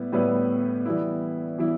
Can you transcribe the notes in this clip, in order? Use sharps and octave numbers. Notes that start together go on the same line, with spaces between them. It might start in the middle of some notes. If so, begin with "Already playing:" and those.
Already playing: A2 G3 B3 E4
A2 G3 B3 E4 B4
E3 G3 B3 E4
E3 G3 B3 E4